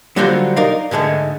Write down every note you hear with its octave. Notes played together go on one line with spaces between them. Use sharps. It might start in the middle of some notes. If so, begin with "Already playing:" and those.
D3 F#3 G3 F4 F#4 C5
D#4 A#4 D5 F5
G#2 D3 G#3 A3